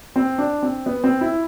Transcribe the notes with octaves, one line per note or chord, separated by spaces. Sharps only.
C4
D4
C4
B3
C4
E4